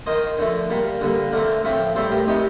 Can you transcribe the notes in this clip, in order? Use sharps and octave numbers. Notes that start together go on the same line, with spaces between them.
D#3 A#3 C5 D#5
D3 F3 A3
A#2 G3 A#3
D3 G3 A#3
D3 A3 C4 A#4 D5
A2 F3 A3 C4
A2 G3 C4 A4 C5
G4 A#4
C3 G3 C4 D#4 G4